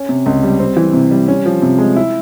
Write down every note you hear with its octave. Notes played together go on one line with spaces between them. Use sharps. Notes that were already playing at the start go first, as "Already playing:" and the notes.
Already playing: C#4
C3
C#2
G3
C4
E3
C3
G3
C#4
F3
C3
G#3
E4